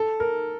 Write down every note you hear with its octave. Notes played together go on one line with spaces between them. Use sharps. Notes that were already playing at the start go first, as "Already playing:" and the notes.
Already playing: A4
A#4